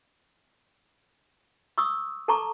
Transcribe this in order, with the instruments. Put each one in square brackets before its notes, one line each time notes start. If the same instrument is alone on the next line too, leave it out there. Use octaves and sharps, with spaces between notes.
[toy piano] C#6 D#6 E6
A4 A5 A#5 C#6 D6